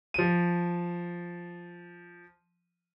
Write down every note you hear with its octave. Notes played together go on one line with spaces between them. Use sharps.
F3 D#7